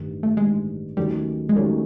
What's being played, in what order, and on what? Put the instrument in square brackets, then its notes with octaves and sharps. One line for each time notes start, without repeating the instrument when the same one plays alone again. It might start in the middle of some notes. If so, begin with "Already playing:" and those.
Already playing: [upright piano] A1 G2 D#3 G3
[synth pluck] A3
[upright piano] A1 G2 D#3 G3 [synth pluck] G#3
[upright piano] D#2 D#3 F#3 A3 C#4 [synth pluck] G3
[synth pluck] G#3
[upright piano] D#2 D#3 F#3 A3 C#4 [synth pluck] G3